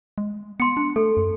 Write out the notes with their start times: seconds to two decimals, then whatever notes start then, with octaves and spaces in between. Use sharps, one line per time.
0.18 G#3
0.60 B3 C6 C#7
0.77 D4
0.96 A3 A4
1.17 F#2